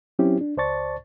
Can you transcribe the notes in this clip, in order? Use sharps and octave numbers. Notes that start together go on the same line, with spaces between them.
F#3 C4 C#4 E4 G4
D4
C#2 C5 D5 A5 C#6 A6